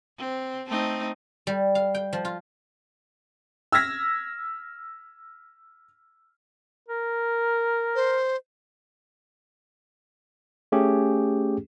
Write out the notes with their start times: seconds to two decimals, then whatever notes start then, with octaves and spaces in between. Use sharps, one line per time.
0.18 C4
0.67 A3 C4 D#4
1.47 G3
1.75 F5
1.95 G5
2.13 F3
2.25 F4
3.72 E6 F6 G#6 A#6 B6
6.88 A#4
7.95 C5
10.72 A3 C#4 G4 G#4